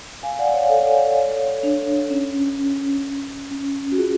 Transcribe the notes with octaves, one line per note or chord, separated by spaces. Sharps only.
F5 G#5
F5
D5 F#5
C#5 F5
A4 C#5
D4
C#4
C#4
F#4
F4 G#4